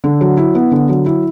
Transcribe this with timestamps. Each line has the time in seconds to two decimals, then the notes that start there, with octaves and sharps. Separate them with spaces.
0.04 D3
0.21 F#3
0.37 E4
0.55 B3
0.72 D3
0.89 F#3
1.06 E4